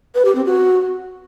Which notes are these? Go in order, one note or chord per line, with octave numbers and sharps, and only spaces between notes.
B4
G4
C4
F#4